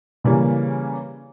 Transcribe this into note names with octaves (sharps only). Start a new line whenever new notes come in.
C#3 E3 G3 A#3 C#4